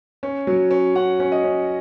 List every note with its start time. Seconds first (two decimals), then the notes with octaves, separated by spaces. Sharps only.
0.23 C#4
0.47 F#3
0.71 C#4
0.95 C#4 F#5
1.20 C#4
1.32 D#5
1.44 C#4